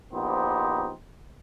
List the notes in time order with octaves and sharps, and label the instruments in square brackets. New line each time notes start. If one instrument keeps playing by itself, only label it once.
[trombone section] A#1 B3 D#4 G4 C5